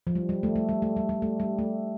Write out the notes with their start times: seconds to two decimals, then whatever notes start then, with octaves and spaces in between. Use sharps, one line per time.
0.07 F3
0.15 G3
0.29 G3
0.43 A3
0.56 A3
0.69 G3
0.82 A3
0.96 G3
1.09 G3
1.22 A3
1.40 G3
1.59 A3